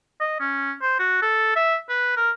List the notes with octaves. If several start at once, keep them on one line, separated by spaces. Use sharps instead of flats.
D#5
C#4
C5
F#4
A4
E5
B4
A#4